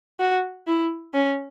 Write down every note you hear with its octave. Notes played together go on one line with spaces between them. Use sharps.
F#4
E4
C#4